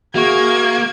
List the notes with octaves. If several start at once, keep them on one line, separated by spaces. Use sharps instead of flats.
A#3 F#4 G#4 E5 C#6 G#6